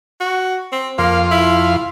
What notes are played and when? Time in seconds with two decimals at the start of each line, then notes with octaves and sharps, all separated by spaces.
0.20 F#4
0.72 C4
0.98 F2 A#3 F5 C6
1.32 E4